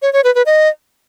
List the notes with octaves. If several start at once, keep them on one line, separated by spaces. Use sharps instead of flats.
C#5
C#5
B4
B4
D#5